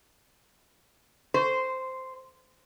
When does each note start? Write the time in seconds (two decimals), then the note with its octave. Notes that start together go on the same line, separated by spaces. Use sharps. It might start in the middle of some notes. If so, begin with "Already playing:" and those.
1.34 C5